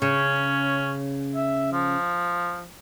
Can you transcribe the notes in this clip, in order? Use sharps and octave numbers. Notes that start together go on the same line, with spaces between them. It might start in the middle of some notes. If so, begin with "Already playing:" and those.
C#3 C#4
E5
F3